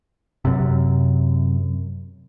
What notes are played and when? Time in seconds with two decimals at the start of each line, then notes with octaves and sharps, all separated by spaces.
0.45 F#2 C3